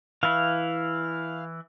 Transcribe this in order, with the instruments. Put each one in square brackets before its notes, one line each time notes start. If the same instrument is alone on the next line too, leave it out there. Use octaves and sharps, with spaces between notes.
[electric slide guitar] E3 E4 [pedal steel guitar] F5